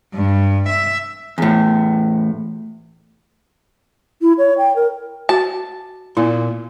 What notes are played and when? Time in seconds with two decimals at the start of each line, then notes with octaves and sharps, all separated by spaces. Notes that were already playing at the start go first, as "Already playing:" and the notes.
0.14 G2
0.69 E5
1.38 E2 A2
4.22 E4
4.38 C#5
4.58 G5
4.76 A#4
5.29 F#4 A5
6.17 A#2 B3 E4